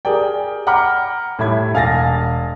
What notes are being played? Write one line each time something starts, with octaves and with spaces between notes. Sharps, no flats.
G4 G#4 A#4 D5 G5
F#5 G5 A#5 B5 D6 F6
A2 G3 E4 G4 B5 G#6
E1 F5 G#5 A6 A#6